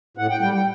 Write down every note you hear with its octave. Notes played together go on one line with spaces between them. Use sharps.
A2 F#5
G5
G3 G5
G5